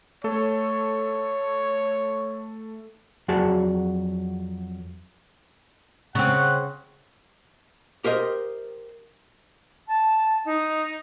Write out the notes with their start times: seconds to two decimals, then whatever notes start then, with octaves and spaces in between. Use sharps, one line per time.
0.24 A3 A4 C#5
3.28 F2 F#3 F#4 G#4 D5 A5
6.15 C#3 C4 F#5
8.05 G4 A#4 C5 D#5
9.87 A5
10.45 D#4